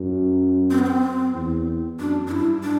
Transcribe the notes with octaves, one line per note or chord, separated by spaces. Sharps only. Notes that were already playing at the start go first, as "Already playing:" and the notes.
Already playing: F#2
C4
B3
C4
E2
F#2 D4
D4
G2 E4
D4